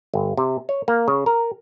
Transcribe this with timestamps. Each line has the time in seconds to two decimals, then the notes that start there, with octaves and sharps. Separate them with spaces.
0.14 G1
0.37 C3
0.69 C#5
0.88 A#3
1.08 C#3
1.26 A#4